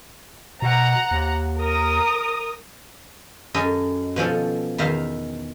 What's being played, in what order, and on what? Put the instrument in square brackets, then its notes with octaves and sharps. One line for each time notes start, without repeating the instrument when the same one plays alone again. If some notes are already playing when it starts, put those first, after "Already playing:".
[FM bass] B2 [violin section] F#5 A#5
[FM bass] D#2
[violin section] A#4 D#6
[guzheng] F#2 C#4 A4 D#5
B2 F3 C#4 A4
E2 D#3 E5 F5